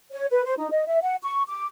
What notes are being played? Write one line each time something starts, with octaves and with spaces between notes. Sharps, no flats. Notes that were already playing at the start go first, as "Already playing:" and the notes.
C#5
B4
C5
D#4
D#5
E5
F#5
C#6
D6